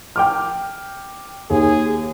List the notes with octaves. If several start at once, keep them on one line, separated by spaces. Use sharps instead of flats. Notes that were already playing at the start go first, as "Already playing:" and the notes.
G5 D6 F6
D#2 G#4